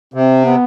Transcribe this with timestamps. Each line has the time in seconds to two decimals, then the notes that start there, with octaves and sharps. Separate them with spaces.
0.14 C3 C4
0.45 B3